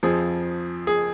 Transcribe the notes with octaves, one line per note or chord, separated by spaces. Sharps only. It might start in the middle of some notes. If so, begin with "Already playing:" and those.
F2 F3 G#4
G#4